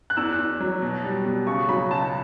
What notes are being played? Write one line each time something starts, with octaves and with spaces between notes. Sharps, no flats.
F#6
E2 E6
E2
F#3
B2
G3
B2
C#3 C#6
F#3 B5
C#2 A5